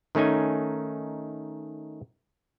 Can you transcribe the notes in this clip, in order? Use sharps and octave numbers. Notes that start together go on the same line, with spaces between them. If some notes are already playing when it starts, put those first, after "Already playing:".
D#3 A3 C#4 D#4 G#5